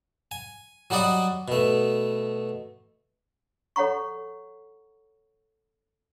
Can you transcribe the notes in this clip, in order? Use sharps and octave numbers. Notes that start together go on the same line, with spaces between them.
G#5
F#3 G3 F#4 D5 D#5 F#5
B2 A3
A4 C#5 F#5 A#5 C#6